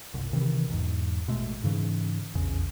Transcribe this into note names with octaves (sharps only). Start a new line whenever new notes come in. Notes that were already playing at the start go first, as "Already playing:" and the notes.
G1 C2
C3 D#3 E3
B1 E2 G#2
A1 B2 G#3 A3
G#2 C#3 E3
F1 A#1 E2 C#3